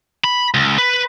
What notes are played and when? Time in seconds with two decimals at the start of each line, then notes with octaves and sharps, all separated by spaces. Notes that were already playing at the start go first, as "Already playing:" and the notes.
0.24 B5
0.54 C#2
0.78 B4